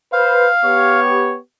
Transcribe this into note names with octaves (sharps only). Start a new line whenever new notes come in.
B4 C5 F5
B3 G4 C#5